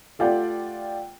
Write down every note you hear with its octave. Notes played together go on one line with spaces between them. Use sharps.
A3 F4 G4 D5 F#5 G5